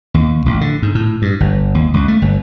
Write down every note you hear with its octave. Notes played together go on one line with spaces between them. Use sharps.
D#2
A1
D3
G#2
A2
G2
G1
D#2
C#2
A3
G1